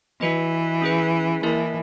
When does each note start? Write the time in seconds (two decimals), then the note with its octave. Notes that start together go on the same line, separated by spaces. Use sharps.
0.21 E3 F#4 B4 D#5
0.82 C#4 G#4 B4
1.43 E3 A#3 E4 A#4 E5